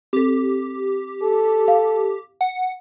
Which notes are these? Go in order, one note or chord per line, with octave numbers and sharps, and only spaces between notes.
C4 G4 A4
A4
F5
F#5